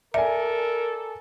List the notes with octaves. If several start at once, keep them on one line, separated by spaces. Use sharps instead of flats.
A4 A#4 D5 E5 G#5